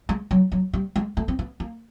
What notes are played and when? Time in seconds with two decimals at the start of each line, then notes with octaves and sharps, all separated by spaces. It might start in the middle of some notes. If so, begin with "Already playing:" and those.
0.09 G#3
0.31 F#3
0.52 F#3
0.73 G3
0.96 G#3
1.17 A3
1.28 C4
1.39 B3
1.60 A#3